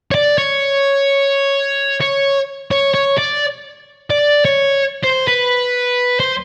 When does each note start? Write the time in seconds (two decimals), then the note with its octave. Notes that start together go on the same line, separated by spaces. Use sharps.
0.11 C#5
0.15 D5
0.38 C#5
2.01 C#5
2.71 C#5
2.94 C#5
3.18 D5
4.10 D5
4.45 C#5
5.03 C5
5.28 B4
6.20 C5